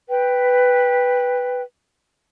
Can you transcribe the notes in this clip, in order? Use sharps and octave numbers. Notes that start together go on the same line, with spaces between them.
B4 G5